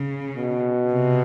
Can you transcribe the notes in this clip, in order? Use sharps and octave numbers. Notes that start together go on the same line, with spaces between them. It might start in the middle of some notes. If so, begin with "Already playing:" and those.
Already playing: C#3
B2
C3